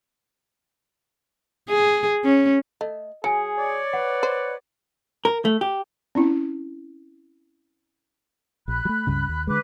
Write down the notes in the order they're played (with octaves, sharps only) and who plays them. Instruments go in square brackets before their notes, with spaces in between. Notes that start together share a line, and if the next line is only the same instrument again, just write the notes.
[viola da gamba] G#4
C#4
[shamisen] A3 [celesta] D#5
[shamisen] F#3 [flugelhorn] G#4 [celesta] G#5 C#7
[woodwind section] C#5 D5
[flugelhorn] B4 [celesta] F#5
[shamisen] C5
[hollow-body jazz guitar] A#4
A3
G4
[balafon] C4 C#4 E4
[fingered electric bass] A#1 [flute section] B5 F#6
[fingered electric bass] F#3 A3
C#2 G2 C#3
D#2
[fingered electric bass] D3 G#3 [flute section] B4 D6 F#6